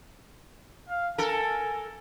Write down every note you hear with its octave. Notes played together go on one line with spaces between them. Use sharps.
F5
A4 A#4 G#5